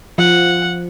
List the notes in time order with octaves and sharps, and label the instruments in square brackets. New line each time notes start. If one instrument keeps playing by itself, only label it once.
[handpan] F3 [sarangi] F#5